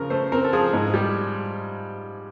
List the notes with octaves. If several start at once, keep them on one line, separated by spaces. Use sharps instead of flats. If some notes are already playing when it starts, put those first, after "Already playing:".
Already playing: C#3 F3 A#4
A3 C5
C4 A#4
A4
F3 G#4
G#2
G3